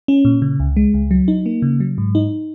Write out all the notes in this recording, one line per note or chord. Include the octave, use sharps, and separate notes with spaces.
C#4
A#2
C#3
C#2
G#3
C#2
F#3
D#4
A#3
C#3
F#3
G#2
D#4